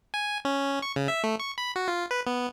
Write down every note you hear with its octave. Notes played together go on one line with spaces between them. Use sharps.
G#5
C#4
C#6
C#3
E5
A3
C#6
B5
F#4
F4
B4
B3